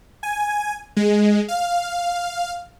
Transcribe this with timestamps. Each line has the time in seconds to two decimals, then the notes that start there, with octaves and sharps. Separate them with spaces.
0.23 G#5
0.97 G#3
1.48 F5